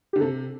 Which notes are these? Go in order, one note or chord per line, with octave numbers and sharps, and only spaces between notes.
D3 G4
C3 A4